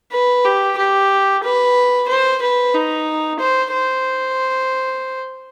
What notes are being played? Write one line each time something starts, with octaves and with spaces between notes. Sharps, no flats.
B4
G4
G4
B4
C5
B4
D#4
C5
C5